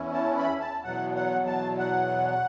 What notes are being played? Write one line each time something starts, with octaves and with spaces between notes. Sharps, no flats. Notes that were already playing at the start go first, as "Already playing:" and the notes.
Already playing: E2 E3 C#4 E4
A5
B5
A5
E2 B2 F#3 F#5
F#5
A5
F#5